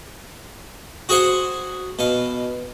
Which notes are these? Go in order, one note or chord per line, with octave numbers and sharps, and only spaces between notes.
F#4 G#4 C5 F#5
B2 F5